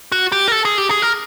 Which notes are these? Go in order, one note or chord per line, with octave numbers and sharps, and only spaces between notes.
F#4
G4
A#4
A4
G#4
G4
G#4
A#4